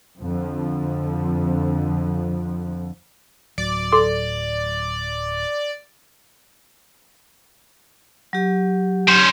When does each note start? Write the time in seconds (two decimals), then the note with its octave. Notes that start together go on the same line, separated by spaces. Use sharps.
0.20 F2 D3 F3
3.58 D1 F#3 D5
3.92 A4 C6 D6
8.33 F#3 G4
9.08 C#4 C5